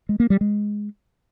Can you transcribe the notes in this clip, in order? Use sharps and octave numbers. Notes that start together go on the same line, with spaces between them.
G#3
A#3
G3
G#3